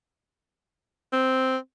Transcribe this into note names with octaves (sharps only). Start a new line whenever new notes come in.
C4